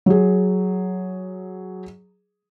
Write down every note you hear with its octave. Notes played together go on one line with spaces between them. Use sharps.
F#3 G#4